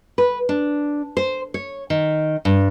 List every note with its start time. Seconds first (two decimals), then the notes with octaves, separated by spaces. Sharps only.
0.18 B4
0.49 D4
1.17 C5
1.54 C#5
1.90 D#3
2.45 G2